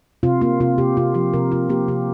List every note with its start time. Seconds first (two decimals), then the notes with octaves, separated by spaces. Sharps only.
0.23 C3 F4
0.41 A#3 F4
0.60 C3 F4
0.78 C3 G4
0.97 C3 F4
1.14 F3 G4
1.33 C3 A#4
1.52 C3 F4
1.69 A#3 G4
1.88 C3 G4